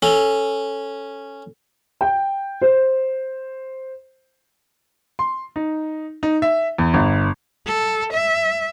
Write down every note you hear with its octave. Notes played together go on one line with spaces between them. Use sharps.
C#4 A4 F7 G7
G5
C5
C6
D#4
D#4
E5
E2
G1
A4
E5